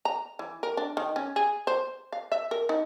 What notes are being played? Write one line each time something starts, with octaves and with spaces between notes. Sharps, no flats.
A#5
E3
A#4
D4
D#3
C#4
G#4
C5
F5
E5
A#4
D#4